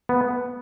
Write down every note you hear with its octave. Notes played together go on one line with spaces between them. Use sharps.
B3